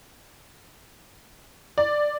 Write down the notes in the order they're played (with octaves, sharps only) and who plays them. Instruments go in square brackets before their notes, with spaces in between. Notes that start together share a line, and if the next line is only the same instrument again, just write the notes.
[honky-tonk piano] D5